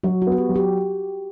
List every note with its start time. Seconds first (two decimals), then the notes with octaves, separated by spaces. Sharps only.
0.04 F#3 F#4
0.22 F#4
0.27 B3
0.32 F#4
0.38 G4
0.49 F#3
0.56 G4